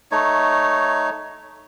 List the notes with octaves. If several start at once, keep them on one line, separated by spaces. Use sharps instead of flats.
A3 D#4 C#5